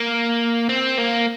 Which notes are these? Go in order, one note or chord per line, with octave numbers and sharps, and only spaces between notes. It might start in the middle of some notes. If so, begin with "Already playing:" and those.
Already playing: A#3
C4
A#3